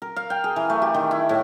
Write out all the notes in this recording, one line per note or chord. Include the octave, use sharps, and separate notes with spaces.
A#4
F5
G5
G#4
E3
A3
G4
D#3
E4
A2